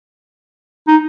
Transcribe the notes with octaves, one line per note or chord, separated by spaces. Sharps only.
D#4